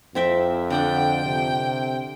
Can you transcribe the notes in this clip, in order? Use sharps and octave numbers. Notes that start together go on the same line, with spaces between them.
F2 C4 E5 G5
D3 D4 F#5 G5
C3